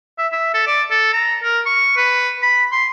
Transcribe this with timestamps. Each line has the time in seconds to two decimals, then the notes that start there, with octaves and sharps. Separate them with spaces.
0.19 E5
0.32 E5
0.54 A4
0.67 D5
0.91 A4
1.13 A#5
1.43 A#4
1.66 C#6
1.97 B4
2.43 B5
2.72 C6